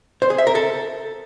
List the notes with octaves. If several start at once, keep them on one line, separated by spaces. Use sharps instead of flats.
C5
G#4
E5
A#4
A4